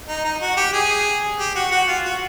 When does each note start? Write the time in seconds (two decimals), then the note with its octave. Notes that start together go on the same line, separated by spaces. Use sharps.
0.08 D#4
0.24 D#4
0.41 F#4
0.57 G4
0.73 G#4
1.39 G4
1.55 F#4
1.71 F#4
1.88 F4
2.04 F#4